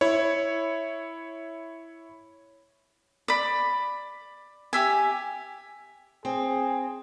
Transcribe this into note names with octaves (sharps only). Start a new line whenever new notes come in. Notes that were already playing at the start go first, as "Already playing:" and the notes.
E4 C#5
D5 B5
G4 E5 G#5
C4 G#4